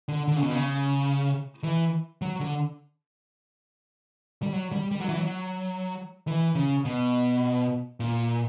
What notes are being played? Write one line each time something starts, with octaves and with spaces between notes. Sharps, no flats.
D3
D3
C#3
B2
C#3
E3
F#3
D3
G3
F#3
G3
G3
F#3
E3
F#3
E3
C#3
B2
A#2